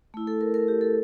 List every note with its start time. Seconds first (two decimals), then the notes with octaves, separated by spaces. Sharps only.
0.14 A3 E4
0.27 A4
0.41 A#4
0.54 A#4
0.68 G4
0.81 A4